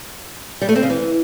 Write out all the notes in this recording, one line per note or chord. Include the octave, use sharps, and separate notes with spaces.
G3
A3
C4
C#3
E3